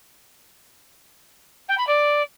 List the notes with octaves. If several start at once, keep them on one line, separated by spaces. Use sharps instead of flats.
G5
B5
D5